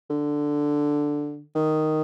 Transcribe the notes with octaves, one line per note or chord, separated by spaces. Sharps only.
D3
D#3